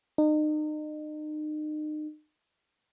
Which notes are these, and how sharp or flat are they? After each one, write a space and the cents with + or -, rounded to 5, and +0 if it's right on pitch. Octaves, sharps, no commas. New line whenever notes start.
D#4 -35